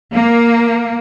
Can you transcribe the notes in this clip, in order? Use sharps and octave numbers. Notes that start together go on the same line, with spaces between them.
A#3